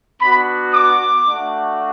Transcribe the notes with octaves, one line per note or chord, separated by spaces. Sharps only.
B3 D4 F#4 B5
D6
A3 D4 F#4